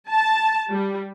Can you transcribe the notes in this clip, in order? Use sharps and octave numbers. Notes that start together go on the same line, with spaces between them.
A5
G3